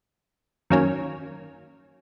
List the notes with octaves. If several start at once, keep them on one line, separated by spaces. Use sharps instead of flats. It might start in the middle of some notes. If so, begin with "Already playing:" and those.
F#2 D#3 F#3 A#3 C#4